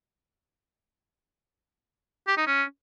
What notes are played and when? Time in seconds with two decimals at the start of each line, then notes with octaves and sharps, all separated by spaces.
2.28 G4
2.37 D#4
2.47 C#4